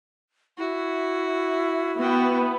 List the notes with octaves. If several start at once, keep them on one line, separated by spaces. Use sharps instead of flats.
E4 F#4
B3 F#4 G5